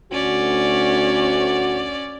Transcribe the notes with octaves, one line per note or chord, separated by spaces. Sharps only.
D2 C#4 F#4 D5